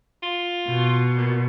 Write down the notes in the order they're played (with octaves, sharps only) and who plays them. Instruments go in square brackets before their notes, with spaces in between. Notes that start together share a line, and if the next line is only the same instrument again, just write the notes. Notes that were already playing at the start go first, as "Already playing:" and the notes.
[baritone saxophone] F4
[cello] B2
[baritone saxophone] A#2